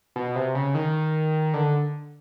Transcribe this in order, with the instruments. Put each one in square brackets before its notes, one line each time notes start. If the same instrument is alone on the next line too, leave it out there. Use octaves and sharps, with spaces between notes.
[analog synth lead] B2
C3
C#3
D#3
D3